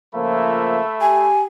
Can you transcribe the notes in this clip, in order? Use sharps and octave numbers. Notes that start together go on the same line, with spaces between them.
C#3 F3 A3 A#3 E5 B5
G4 G#5